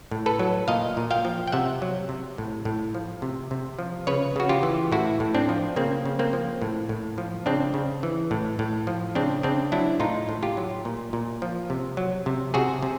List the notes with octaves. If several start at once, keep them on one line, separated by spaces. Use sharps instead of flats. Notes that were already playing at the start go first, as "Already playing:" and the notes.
A2
A4 B4
F#3
A#2 D#5 F5
A#2
F5 G5
F3
G5
C3 E5 F#5
F#3
C3
A2
A2
F3
C3
C3
F3
C#3 B4 C#5
C#3 F#4
F4 G4
E3
A2 E4 F#4
A2
C4 D4
F3
C#3 A#3 C4
C#3
A#3 C4
F3
A2
A2
F3
C#3 C4 D4
C#3
E3
A2
A2
F3
C#3 C4 D4
C#3 C4 D4
F#3 D4 E4
A2 D#4 F4
A2
F4 G4
F#3
A#2
A#2
F3
C3
F#3
C3
C3 F#4 G#4
C3